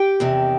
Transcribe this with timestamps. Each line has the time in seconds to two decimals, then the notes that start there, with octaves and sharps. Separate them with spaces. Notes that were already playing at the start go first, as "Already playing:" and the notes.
Already playing: G4 G5
0.20 E2 C3 D#3